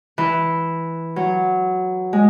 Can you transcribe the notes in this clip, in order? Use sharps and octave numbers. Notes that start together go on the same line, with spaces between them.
E3
F#3
G#3